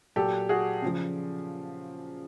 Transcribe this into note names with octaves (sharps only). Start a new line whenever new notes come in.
A#2 F#3 G4 A4
F#4 G#4
C#3 F3